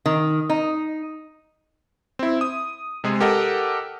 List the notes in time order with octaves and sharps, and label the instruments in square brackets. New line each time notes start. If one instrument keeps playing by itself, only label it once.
[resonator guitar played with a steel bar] D#3
D#4
[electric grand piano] C4 E4
D#6
C3 G#3 G#4
G4 A4 A#4 D#5 F#5